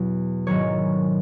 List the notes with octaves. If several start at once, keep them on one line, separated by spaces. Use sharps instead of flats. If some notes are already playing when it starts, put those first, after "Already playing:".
Already playing: E2 B2 F#3
G#1 G#2 D#3 F#3 C#5